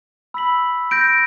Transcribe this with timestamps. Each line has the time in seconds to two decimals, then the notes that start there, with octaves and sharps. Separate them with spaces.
0.34 B5 E6 B6 F#7
0.91 G6 A#6 D7